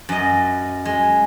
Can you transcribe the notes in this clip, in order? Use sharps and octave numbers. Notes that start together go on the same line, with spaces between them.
F#2 D#5
G#3